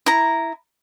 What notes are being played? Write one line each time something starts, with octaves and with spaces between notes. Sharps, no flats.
E4 A#5